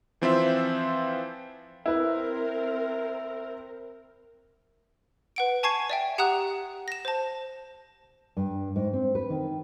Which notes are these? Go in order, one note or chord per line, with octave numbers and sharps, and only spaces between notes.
E3 F3 C4 F4 C5 E5
C4 E4 A#4 B4
B4 F#5 D7
G#5 A5 C#6 G#6 C7 D#7
D5 E5 G5
G4 F#5 A#5 D#6 F#6
A#6 E7
C5 A5
G2
G#2
C4
B4
D#3